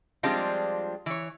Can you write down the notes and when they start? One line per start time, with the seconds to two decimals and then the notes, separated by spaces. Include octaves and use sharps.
0.23 F3 G3 G#3 C4 D4 F4
1.06 E3 C#5